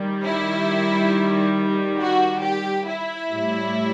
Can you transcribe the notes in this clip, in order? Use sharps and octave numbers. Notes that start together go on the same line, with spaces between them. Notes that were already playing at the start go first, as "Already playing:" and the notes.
Already playing: D#3 G3
E4
F#4
G4
E4
A2 G3